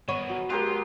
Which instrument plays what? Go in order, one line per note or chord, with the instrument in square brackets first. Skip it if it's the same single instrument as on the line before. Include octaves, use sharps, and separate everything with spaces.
[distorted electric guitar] D#3 E3 [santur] B3 [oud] C#5
[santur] F#3
[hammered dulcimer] G#3 G4 A#4 [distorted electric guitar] F4